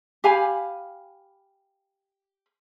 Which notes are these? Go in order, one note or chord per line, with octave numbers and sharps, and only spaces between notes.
G4 F5 G#5 B5